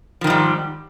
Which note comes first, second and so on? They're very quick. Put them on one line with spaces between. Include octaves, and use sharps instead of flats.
F3 D#3 G#2 G3